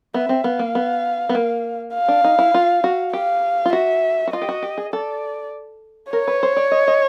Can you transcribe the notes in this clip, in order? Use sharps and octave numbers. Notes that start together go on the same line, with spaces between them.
B3 E5
C4
B3 F5
A#3
B3
B3
A#3
F5
D4
D#4
E4
F4
F#4
G4 F5
F4
F#4 E5
F#4
F4 D#5
G4
F#4
G4
G#4
A4 D5
A#4 C#5
B4
C5
D5
D#5
D#5